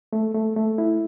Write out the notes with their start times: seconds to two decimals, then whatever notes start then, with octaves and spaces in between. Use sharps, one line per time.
0.13 A3
0.35 A3
0.56 A3
0.78 E4